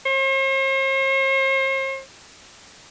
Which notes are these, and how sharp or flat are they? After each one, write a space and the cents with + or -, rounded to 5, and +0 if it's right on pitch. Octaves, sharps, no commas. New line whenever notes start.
C5 +45